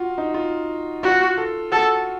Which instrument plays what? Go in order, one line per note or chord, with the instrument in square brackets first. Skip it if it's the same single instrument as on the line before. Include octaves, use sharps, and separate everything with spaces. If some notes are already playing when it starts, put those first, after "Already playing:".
Already playing: [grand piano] F4 F#4
D#4
F4
[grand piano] F4 [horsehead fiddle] F#4
[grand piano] A4
[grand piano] F#4 [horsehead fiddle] A4